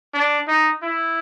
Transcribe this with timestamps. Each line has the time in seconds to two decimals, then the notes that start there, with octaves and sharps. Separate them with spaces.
0.14 D4
0.48 D#4
0.82 E4